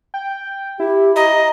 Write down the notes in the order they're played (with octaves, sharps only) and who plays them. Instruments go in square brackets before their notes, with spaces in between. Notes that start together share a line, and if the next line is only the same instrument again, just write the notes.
[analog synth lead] G5
[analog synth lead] E4 [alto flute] G4
[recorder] D#5 [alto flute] A#5